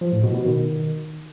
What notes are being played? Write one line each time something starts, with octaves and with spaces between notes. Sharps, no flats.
F3
A2
B2
B2
D#3